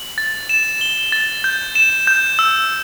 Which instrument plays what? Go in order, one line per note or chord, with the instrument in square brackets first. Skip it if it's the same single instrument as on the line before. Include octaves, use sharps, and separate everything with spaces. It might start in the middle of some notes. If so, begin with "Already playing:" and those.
Already playing: [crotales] F#7
A6
E7
G7
A6
G6
E7
G6
E6